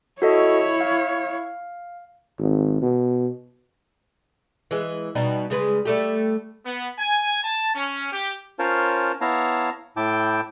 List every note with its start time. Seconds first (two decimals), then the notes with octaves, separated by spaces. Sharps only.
0.22 E4 F#4 A4 C#5 D#5
0.81 F5
2.39 G#1
2.82 B2
4.71 E3 G#3
5.15 B2 G3 D#4
5.50 C#3 G#3 B4
5.85 G3 A3 G4
6.66 B3
6.99 G#5
7.44 A5
7.75 C#4
8.13 G4
8.59 C#4 F4 A#4 C5 C#5 A5
9.21 B3 E4 C#5 F5 A5 A#5
9.97 A2 E4 G5 A5 D6 G6